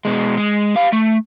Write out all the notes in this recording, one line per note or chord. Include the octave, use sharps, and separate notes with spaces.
B2 G#3
G#3
G4 F5
A3